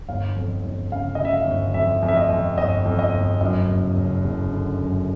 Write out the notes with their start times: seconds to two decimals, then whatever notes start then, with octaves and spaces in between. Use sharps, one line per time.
0.08 G1 F5
0.36 F2
0.64 G1
0.92 C#3 F5
1.15 D#5
1.19 C#3
1.25 E5
1.33 F5
1.47 G1
1.74 F2 E5
2.03 F2
2.08 E5
2.16 D#5
2.30 F2
2.58 G1 D#5
2.85 F2
2.99 D#5
3.14 G1
3.41 F#2 D#5
3.69 F#1
3.96 F#1
4.24 F#1
4.52 D3
4.80 F#2